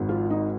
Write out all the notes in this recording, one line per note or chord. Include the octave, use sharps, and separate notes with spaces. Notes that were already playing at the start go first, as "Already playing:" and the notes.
Already playing: G#1 G#2
F3 F4
D#4